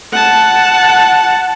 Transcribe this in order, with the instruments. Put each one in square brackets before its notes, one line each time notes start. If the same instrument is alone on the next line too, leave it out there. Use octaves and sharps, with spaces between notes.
[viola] F#5 A5